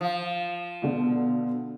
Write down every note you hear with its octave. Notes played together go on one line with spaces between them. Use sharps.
F3
B2 D3